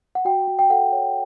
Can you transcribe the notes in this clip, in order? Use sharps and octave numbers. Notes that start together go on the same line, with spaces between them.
F#5
F#4 G5
F#4
G5
A4 F#5
C#5